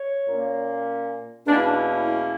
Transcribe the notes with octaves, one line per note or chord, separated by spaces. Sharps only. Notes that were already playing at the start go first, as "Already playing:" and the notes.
Already playing: C#5
A#2 A#3 C#4
E2 B2 A#3 C#4 D4
E4
D4
E4
E4